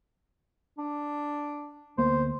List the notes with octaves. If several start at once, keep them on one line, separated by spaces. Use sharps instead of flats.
D4
D2 A#3 B3 C5